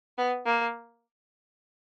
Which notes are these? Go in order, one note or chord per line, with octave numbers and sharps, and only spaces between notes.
B3
A#3